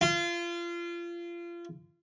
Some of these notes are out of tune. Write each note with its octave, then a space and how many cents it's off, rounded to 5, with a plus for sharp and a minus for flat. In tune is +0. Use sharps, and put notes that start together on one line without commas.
F4 -30